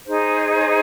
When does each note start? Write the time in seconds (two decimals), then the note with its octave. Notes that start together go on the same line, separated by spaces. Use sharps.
0.06 D#4 G#4 C5